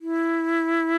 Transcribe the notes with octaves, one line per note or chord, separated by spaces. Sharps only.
E4